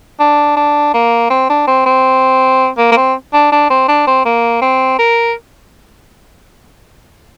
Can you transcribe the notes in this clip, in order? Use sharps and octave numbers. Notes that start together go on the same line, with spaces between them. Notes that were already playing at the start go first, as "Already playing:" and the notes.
D4
D4
A#3
C4
D4
C4
C4
A#3
A#3
C4
D4
D4
C4
D4
C4
A#3
C4
A#4